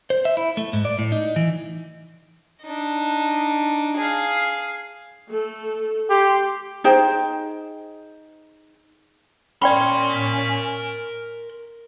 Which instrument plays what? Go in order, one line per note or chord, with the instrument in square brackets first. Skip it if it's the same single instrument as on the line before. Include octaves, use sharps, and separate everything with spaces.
[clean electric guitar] C5
E5
E4
A3
G#2
D5
A2
D#4
E3
[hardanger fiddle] D4 D#4
G#4 F5
[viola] A3 A4
[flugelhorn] G4 [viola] C6
[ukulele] D#4 G#4 C5 G5
[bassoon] C#4 [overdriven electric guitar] A#4 C6 [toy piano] D5 G5 B5